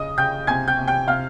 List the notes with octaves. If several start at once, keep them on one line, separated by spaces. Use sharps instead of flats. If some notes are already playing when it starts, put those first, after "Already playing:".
Already playing: C#3 D#5 D#6
C#3 G5 G6
C3 G#5 G#6
G5 G6
C3
G5 G6
C3 F5 F6